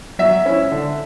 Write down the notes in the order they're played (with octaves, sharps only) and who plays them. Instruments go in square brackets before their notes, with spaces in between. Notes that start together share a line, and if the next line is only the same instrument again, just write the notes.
[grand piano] F#3 E5
C#4 E4
D3